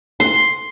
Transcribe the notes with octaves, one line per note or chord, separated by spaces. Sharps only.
C6